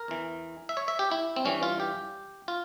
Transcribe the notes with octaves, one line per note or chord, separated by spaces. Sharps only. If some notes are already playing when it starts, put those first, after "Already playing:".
Already playing: A#4
E2 E3
E5
C#5
E5
G4
E4
C4
G2 E3 C#4
F4
G4
F4